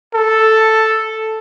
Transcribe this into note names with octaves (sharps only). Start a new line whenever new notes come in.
A4